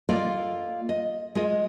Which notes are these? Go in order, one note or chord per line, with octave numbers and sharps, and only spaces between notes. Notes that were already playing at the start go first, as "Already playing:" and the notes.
A#3 F4 A4 D5 D#5 F5
D#5
G#3 F4 D#5